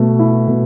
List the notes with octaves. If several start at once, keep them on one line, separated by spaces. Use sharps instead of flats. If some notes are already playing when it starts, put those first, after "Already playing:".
Already playing: B2 A3
E4
B2